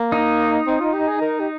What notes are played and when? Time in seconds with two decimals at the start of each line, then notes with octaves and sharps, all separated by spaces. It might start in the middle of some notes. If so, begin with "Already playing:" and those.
Already playing: A#3
0.12 D#4
0.67 C4
0.80 F4
0.93 G4
1.07 G#4
1.21 A#4
1.40 G4